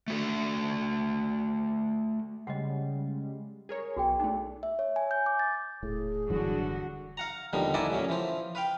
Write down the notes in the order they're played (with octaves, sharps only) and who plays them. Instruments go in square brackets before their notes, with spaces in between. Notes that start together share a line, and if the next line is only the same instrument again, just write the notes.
[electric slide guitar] A3 F#4 A4
[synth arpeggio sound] C#3 G3 G#3 [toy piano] D#5 F#5
[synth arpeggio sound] G#4 A#4 C#5
[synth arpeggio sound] B1 [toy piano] F#4 G#4 G5
[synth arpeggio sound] A3 D4 [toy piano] D#4
[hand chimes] E5
C#5
G#5
G6
D6
A6
[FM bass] D#1 [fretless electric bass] A2 [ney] G#4
[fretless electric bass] G2 E3 F#3 [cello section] D3 F#4
[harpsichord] F5 F#5 A#5
D#2 B2 D3 F3 G3 D#4
D#4 E4 F#4 D5 G#5 A5
A1 A#2 F#3 C#4
E3 F3 C5
B4 F5 G5